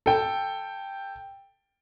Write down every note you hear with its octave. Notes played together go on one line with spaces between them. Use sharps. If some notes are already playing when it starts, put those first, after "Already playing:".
A4 G5